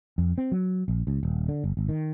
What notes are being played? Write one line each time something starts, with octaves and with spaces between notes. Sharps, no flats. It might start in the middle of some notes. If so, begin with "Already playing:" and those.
F2
C4
F#3
A#1
C#2
D#1
D3
G1
G#1
D#3